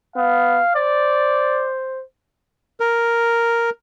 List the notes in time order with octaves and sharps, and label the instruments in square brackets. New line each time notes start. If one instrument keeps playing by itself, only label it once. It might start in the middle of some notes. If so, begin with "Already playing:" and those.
[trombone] B3 [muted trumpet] F5
[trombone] C5 [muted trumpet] D5
[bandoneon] A#4